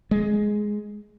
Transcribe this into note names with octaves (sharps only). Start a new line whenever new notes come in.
G#3